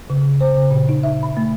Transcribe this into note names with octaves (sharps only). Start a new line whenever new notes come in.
C#3
C5
C#3
A#2
D#4
E5
B5
A3